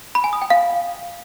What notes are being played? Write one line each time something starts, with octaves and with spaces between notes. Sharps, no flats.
B5
G#5
D#6
G5
F5